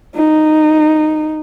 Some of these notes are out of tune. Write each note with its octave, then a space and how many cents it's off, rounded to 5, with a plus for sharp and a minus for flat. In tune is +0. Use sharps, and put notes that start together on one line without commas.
D#4 -10